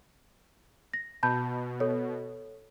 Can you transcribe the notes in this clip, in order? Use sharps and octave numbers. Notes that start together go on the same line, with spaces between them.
A#6
B2 A5 B5 G6
A4 C#5